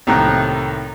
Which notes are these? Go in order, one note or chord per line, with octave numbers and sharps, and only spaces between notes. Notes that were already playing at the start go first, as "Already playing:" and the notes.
C2 A2 D#3 A#3 F#6